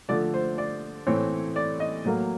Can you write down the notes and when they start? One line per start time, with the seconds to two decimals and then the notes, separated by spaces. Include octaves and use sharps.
0.09 D3 F3 A3 D5
0.34 C5
0.58 D5
1.07 A2 E3 A3 C4 C#5
1.56 D5
1.80 D#5
2.05 A2 F#3 A#3